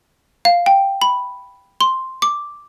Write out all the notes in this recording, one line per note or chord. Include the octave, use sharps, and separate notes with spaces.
F5
G5
B5
C6
D6